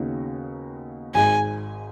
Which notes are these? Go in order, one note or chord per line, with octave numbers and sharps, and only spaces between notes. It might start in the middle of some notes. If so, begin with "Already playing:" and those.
Already playing: D#2 C#3 B3 D#4 F#4
G#1 G#2 G#3 D#4 G#5